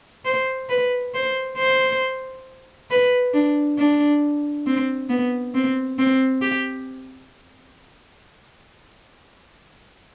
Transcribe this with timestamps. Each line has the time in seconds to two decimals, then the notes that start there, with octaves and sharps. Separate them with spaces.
0.25 C5
0.69 B4
1.14 C5
1.57 C5
2.90 B4
3.34 D4
3.79 D4
4.67 C4
5.10 B3
5.54 C4
5.99 C4
6.42 G4